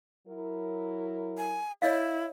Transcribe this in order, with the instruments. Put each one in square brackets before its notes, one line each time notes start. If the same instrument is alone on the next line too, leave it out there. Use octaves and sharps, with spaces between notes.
[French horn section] F#3 E4 A#4
[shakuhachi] G#5
[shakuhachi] E4 [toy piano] C#5 D#5 F5